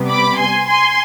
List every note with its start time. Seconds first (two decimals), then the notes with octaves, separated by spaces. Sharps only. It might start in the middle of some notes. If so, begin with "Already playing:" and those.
Already playing: C3 G3 B3
0.10 B5 D6
0.39 G#5 C6
0.68 G#5 C6